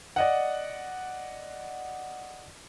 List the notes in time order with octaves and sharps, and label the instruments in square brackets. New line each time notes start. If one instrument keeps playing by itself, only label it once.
[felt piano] D5 D#5 F#5